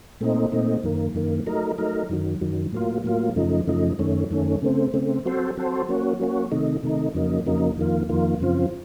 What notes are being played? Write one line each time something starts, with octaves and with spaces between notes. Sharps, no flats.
A#2 A3 C4 D#4
A#2 A3 C4 D#4
F#2 D#3 A#3
F#2 D#3 A#3
F#3 A3 D#4 A#4
F#3 A3 D#4 A#4
F#2 D#3 F#3
F#2 D#3 F#3
A2 F#3 A#3 F4
A2 F#3 A#3 F4
F#2 C#3 F3 A3 D#4
F#2 C#3 F3 A3 D#4
F#2 D#3 A3 C#4
F#2 D#3 A3 C#4
C#3 A3 C4
C#3 A3 C4
F#3 C4 F#4 A4 C5
F#3 C4 F#4 A4 C5
F#3 A#3 C#4 F#4
F#3 A#3 C#4 F#4
C3 D#3 A3 D#4
C3 D#3 A3 D#4
F2 C#3 F#3 A#3 D#4
F2 C#3 F#3 A#3 D#4
F2 D#3 A#3 F4
F2 D#3 A#3 F4
F#2 C#3 F3 C4 F4